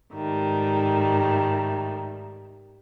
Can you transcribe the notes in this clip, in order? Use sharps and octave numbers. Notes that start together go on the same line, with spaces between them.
G#2 D#3 G3 A3